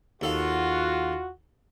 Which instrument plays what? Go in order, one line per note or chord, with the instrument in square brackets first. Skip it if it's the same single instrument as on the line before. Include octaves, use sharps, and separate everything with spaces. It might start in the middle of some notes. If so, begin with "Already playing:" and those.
[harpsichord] D#2 A4 F5 [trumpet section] F4 F#4